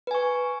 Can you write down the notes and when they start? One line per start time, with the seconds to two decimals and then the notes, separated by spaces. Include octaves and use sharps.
0.07 B4
0.11 G#5
0.15 C#6